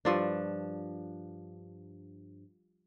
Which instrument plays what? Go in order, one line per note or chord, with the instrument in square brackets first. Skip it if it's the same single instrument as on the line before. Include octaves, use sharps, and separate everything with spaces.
[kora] G2 F3 D4